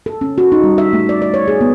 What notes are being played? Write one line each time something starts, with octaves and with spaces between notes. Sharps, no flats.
A4
C#4
F#4
D#4
G3
E5
A3
D5
D5
C#5
G#4
B3